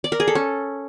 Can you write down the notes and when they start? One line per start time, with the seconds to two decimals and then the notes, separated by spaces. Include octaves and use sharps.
0.04 D5
0.12 A#4
0.20 G#4
0.28 A4
0.35 C#4